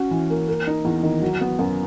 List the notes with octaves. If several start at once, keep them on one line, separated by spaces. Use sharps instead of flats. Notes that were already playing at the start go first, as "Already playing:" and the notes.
Already playing: C#4 F#4
E3
A#3
A#3
D#4
E2
D#3
F#3
B3
F#2